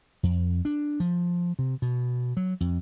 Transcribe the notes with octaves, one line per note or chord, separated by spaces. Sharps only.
F2
D4
F3
C3
B2
F#3
F2